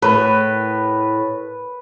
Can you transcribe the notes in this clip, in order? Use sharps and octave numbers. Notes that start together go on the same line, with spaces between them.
A2 B4